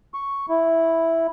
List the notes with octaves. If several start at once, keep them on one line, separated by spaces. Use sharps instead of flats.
C#6
E4